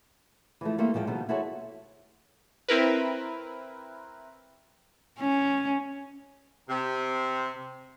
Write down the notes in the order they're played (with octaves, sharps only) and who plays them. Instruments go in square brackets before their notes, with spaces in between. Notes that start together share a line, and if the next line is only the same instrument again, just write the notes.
[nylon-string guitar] E3 F3 A3
G3 A3 A#3 C4 C5 E5
E2 F3 G#3 D#5 G5
B2 D#3 F3 G3
E4 F#4 G#4 A4 C5 C#5
[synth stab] C4 E4 A#4 B4
[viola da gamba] C#4
[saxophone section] C3